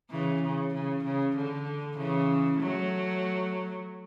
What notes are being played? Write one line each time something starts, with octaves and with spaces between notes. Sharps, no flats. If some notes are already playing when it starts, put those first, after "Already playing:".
C#3 E3
C#3
C#3
C#3
D3
C#3 E3
F#3 A3